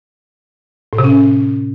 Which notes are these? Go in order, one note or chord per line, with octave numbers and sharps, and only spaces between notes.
A2
C3
C#4